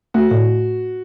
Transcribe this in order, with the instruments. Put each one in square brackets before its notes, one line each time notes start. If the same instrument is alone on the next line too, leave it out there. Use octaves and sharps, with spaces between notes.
[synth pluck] A3 [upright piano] F#4
[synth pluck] A2